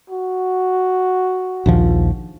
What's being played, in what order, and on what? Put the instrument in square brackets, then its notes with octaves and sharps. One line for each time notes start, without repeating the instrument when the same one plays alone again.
[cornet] F#4
[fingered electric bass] A#1 D#2 F3